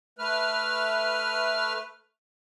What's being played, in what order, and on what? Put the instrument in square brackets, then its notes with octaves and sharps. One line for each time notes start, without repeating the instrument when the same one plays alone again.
[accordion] A3 B4 F6